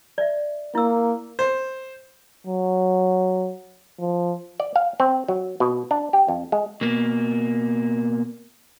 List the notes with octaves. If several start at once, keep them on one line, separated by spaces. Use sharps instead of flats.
D5 E5
A#3 E4 E6
C5
F#3
F3
D5
F5
C4
F#3
B2
D4
G4
F2
G#3
B2 A#3